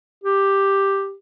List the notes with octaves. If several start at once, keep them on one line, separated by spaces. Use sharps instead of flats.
G4